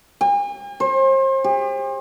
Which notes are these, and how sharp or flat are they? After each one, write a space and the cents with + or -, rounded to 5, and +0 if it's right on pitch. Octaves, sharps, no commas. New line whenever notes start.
G#5 -45
C5 +35
G4 +40